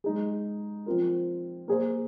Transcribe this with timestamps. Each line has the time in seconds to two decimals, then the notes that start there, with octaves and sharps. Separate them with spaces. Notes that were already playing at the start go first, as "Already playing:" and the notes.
0.04 G#3 D#4 G#4
0.86 F3 C4 F4 A#4
1.68 A#3 G#4 C5